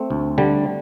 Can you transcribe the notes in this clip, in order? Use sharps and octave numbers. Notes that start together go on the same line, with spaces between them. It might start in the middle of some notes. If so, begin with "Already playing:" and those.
Already playing: A3 C4
D2
D3 G3